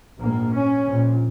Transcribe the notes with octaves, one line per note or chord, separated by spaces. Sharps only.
A#1 G#2 A#3
C#4
A#1 A#2